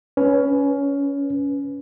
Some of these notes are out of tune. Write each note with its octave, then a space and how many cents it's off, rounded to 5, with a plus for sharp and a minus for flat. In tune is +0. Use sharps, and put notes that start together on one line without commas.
C#4 +20 B4 +0